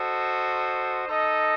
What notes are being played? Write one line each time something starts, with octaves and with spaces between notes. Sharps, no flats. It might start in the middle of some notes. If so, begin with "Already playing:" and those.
Already playing: F#4 A4 C5 D#5
D#4 A4 D#5